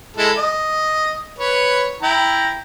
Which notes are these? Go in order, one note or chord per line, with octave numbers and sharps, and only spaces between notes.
G#3 E4 A4
D#5
B4 C#5
E4 G5 A#5